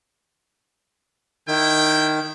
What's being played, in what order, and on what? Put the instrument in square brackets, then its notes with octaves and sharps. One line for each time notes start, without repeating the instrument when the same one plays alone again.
[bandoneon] D#3 [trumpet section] E4 G5